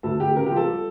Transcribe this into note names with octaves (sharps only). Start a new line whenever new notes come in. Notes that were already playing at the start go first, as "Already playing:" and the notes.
D2 A4
D2 G4
C#3 A#4
G4
F3
A4
G3